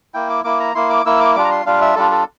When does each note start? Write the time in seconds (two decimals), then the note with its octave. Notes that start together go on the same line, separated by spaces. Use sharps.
0.14 A#3 E4 G5
0.30 D6
0.44 A#3 E4 D6
0.60 A#5
0.75 A#3 E4 C6
0.90 D6
1.06 A#3 E4 E6
1.20 D6
1.35 G3 D4 F4 D6
1.45 A#5
1.51 C6
1.66 G3 D4 F4 F5
1.81 E5
1.96 G3 D4 F4 A4
2.11 A4